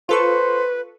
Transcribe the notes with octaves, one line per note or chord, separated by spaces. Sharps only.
F4 A4 B4 C5 C#6